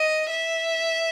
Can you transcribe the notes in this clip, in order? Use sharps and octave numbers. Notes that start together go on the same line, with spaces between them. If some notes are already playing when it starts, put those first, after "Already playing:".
Already playing: D#5
E5